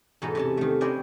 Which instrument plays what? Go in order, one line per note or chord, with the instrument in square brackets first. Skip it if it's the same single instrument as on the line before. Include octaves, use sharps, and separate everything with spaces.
[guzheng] E2 G#2 B2 D#4 A4
C3 C#4 A5
D#3 A3
C#4 E4 D5 D#5 G5 C6